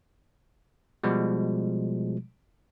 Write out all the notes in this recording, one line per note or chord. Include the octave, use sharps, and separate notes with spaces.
B2 F3 G3 G#3